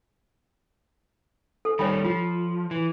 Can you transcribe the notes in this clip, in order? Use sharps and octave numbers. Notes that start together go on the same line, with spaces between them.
A4
D#3 G3 C#5 G5 B5
F3 F4
E3